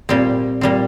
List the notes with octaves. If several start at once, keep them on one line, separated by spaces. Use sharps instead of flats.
A#2 G3 C4
A#2 G3 C4